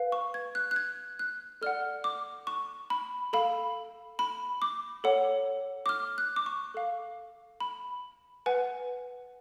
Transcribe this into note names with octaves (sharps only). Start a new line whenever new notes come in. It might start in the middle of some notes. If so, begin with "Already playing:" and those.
Already playing: B4 F5
C#6
G#6
F#6
F#6
G#6
F#6
A4 D5 F#5 F6
D6
C#6
B5
A4 F5 B5
B5
D6
A4 C#5 F#5
D6
F6
F#6
D6
C#6
A4 F5
B5
B4 F#5 G#5